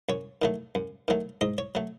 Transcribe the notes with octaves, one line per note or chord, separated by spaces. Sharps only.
F#2 C#5
D#3 F#3 A3
F#2
D#3 F#3 A3
G#2 D#5
C#5
F#3 A3